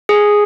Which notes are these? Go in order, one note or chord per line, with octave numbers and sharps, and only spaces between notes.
G#4